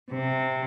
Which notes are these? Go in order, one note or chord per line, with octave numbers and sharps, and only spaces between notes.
C3